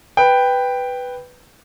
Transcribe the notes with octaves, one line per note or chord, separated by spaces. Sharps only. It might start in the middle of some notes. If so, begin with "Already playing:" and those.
B4 G5